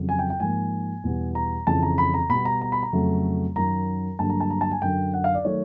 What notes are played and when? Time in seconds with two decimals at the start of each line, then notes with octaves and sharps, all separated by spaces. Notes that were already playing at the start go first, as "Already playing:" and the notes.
Already playing: F2 C#3 F#3
0.09 G#5
0.19 G5
0.30 G5
0.40 G#2 F3 A#3 G#5
1.04 E2 B2 G3 B3
1.35 A#5
1.67 F2 C#3 E3 A5
1.83 A#5
1.98 B5
2.14 A#5
2.29 B2 G3 B3 B5
2.45 A#5
2.61 A#5
2.72 B5
2.83 A#5
2.93 F2 C#3 F#3 A3
3.56 F#2 D#3 F#3 A#5
4.19 G2 D3 F#3 A#3 A5
4.30 A#5
4.40 A5
4.50 A#5
4.61 A5
4.72 G#5
4.82 F#2 D3 F#3 G5
5.14 F#5
5.24 F5
5.34 D5
5.45 D#3 F#3 A3 C#5